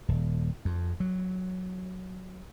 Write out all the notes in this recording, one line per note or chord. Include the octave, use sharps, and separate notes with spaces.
D#1
F2
F#3